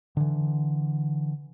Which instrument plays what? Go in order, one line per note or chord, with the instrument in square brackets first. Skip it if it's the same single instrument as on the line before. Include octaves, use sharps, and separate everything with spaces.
[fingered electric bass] D3 E3